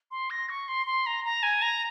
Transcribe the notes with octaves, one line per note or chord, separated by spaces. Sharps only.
C6
A#6
C#6
C6
C6
A#5
A#5
G#5
A#5